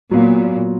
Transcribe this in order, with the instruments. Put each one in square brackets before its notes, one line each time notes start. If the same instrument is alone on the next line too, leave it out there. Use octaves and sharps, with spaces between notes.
[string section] A#2 [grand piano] F#3 B3 F4